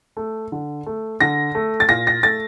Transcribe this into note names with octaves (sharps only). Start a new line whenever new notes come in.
A3
D3
A3
D3 A#6
A3
A6
A#2 A#6
A#6
A3 A6